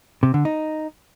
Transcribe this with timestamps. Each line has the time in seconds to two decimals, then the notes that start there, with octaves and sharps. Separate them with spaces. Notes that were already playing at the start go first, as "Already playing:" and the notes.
0.23 C3
0.34 D3
0.45 D#4